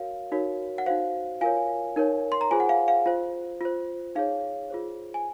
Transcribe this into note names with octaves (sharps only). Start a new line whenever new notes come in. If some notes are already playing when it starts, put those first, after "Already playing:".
Already playing: F#4 A#4 C#5 F5
D#4 F#4 A#4 C#5
F#5
D#4 F#4 C5 F5
F4 A#4 C#5 F5 G#5
D#4 A#4 C#5
C6
A#5
F4 G#4 C5 G#5
F#5
F5
F5
F4 C5
F4 C5
D#4 G#4 C#5 F5
F4 G#4 C5
G#5